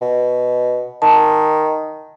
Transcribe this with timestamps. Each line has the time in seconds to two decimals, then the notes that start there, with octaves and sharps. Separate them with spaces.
0.01 B2
1.02 D#3 A5